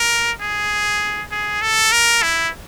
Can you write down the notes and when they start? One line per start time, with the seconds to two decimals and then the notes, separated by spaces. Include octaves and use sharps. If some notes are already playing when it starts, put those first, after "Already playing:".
Already playing: A#4
0.41 G#4
1.31 G#4
1.62 A4
1.92 A#4
2.22 E4